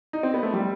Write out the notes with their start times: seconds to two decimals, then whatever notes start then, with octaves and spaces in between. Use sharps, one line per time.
0.13 D#4
0.23 C4
0.34 B3
0.43 A3
0.53 G3